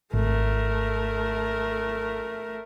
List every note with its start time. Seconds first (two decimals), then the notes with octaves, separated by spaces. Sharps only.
0.13 G#1 A3 A#4